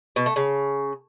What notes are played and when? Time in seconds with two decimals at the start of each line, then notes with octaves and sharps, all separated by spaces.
0.16 B2
0.26 A3
0.36 C#3